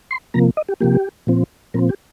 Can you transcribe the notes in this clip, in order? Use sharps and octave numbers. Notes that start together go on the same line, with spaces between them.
C6
C3 F3 A#3 A#5
D#5
G4
C3 F3 A#3 G4
A#2 F3 C4
A#2 F3 C4 A#4
G4